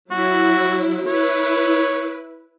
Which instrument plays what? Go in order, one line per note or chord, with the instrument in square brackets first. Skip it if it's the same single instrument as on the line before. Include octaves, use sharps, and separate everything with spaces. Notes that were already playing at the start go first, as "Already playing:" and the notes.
[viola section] F#3 E4 [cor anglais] F#4
[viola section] E4 B4 [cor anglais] C#5